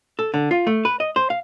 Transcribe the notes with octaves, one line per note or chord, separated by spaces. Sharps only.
A4
D3
F4
A3
B4
D#5
C5
F5